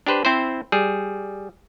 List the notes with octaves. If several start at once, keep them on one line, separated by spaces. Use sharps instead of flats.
D4 G4 B4 C5
C4 E4 C5
G3 G#4